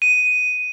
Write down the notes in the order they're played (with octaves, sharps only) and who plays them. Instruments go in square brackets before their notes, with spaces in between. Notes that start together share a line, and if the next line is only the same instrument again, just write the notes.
[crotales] D#7